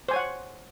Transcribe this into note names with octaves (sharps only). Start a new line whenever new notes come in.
C5 C#5 F#5 G#5